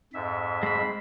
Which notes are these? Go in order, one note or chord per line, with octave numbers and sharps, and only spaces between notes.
F2 G#2 E5
G#3 B5